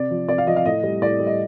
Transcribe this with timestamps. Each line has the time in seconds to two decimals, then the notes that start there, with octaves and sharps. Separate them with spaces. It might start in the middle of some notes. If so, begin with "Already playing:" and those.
Already playing: C3 D5
0.10 F3
0.28 C3 D5
0.38 F5
0.47 F3 D#5
0.56 F5
0.65 A2 D#5
0.83 G3
1.02 A2 D5
1.20 G3
1.27 D#5